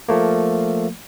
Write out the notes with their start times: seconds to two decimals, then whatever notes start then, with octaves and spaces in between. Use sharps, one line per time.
0.09 F3 A3 A#3